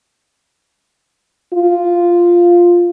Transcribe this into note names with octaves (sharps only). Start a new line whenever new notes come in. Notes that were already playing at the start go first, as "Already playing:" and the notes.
F4